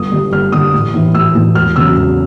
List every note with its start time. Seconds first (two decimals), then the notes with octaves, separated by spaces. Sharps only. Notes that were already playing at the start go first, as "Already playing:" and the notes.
Already playing: G1 D#6
0.12 G2 D3 G3
0.32 G1 F6
0.52 G2 D3 G3 D#6
0.73 A1
0.94 A2 E3
1.14 A1 E6
1.35 A2 E3
1.55 E1 F6
1.76 E2 C#3 F#3 E6
1.96 E1